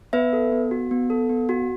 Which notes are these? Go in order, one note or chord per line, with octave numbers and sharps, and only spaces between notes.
B3 B4 E5
A4
B3
F#4
B3
A4
B3
F#4